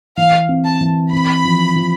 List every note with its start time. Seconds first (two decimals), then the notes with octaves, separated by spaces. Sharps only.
0.17 E3 F5
0.49 C4
0.65 A5
0.81 E3
1.13 C4 B5
1.45 F3
1.76 F3